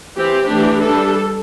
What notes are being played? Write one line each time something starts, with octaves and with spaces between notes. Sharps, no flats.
E3 C4 G4
E3 A3 D4
G3 D4 A4